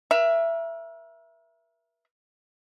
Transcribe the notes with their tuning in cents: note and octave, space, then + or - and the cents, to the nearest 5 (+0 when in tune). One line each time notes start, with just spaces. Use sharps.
A#4 +40 E5 +15